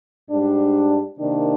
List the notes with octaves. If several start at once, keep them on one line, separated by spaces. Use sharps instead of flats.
G#2 G3 D4
C3 D#3 A#3 D4